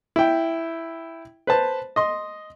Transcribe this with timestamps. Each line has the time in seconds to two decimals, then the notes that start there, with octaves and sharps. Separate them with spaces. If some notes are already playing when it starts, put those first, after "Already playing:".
0.16 E4 G5
1.47 B4 C5 A5
1.96 D#5 C6